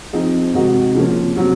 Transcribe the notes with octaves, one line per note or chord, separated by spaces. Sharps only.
F3 C4 D#4 G#4
C3 D#3 G#3 D#4 F#4
C#3 F3 A#3 C#4
C3 F#3 C4